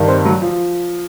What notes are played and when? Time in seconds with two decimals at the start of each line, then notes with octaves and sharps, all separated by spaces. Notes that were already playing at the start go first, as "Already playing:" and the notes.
Already playing: G2 D#3
0.08 C4
0.25 F#3
0.42 F3